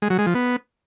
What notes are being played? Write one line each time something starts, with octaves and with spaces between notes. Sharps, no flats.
G#3
F#3
G#3
F3
B3